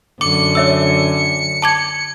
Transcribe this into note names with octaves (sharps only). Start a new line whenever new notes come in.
F#2 D3 D6 C#7
C#5 E5 E6
A5 D6 G#6